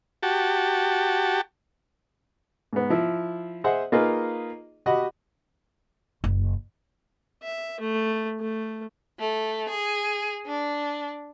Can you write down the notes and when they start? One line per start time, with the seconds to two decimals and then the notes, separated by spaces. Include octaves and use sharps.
0.23 F#4 G4 A5
2.73 G#2 B3
2.90 F3 E4
3.64 G#4 C5 D#5 E5 F#5
3.92 A#3 D#4 F4 G#4 B4 D#5
4.86 F#4 G4 D#5 F#5 B5
6.24 F#1
7.42 E5
7.80 A3
8.40 A3
9.19 A3
9.69 G#4
10.47 D4